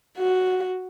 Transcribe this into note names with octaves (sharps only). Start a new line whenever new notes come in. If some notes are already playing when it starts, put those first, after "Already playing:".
F#4